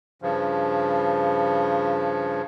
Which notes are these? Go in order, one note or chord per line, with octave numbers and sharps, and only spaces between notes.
G2 C#3 F3